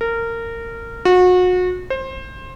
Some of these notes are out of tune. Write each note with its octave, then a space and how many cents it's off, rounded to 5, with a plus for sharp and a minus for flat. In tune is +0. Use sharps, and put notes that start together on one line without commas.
A#4 -20
F#4 -30
C5 +20